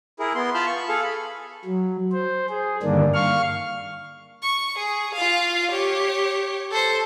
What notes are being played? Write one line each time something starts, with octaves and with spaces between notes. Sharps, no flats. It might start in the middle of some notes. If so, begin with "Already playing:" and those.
E4 G#4 A#4
B3 C6
F4 A5 B5 F6 G6
C#6
G#4 A4 F5
B5
F#3
C5
G#4
G2 D3 D#3 A#3 D4
F5 C#6 F6
C#6
G#4
F4 F5
G4 C#5
A4 C5